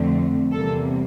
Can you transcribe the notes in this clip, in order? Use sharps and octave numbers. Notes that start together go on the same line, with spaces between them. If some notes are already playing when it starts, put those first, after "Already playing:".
Already playing: F2 D3 A3 C4
E2 C3 G3 A#3 A4